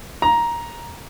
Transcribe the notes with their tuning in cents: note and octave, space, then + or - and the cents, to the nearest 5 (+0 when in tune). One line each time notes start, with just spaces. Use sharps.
A#5 +10